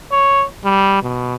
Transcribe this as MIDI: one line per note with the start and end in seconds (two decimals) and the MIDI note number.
0.12 0.44 73
0.65 0.98 55
1.03 1.35 47